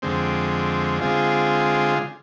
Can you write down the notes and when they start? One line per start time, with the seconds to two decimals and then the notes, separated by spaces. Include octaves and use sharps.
0.02 F2 D3 G#3 C4
1.01 D3 G#3 C4 F4 G#4